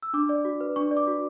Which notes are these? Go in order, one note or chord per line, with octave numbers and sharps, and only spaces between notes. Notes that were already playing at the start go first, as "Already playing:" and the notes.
E6
D4 D6
D5
F#4
B4
D4 C#6
D5
D6
F#4